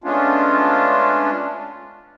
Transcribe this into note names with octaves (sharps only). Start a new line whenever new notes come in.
G#3 A3 B3 C#4 D4 F4